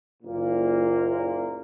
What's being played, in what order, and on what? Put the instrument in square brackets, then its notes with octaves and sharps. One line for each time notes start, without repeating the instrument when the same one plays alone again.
[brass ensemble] F#1 A#2 A#3